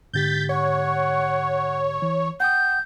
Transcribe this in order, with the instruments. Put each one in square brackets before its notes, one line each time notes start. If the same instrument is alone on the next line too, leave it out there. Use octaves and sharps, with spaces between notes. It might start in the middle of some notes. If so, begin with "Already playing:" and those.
[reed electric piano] G#2 D3 G4 [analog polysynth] G6 A6 B6
[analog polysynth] C#5 [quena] F#5
[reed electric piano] E3
[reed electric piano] F#5 G5 D#6 [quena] G6